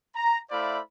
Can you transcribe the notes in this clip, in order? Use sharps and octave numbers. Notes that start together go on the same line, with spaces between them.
A#5
A3 E4 C5 D5 F5 B5